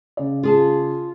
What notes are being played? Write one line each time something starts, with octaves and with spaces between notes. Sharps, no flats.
C#3 D5
F4 G#4 A5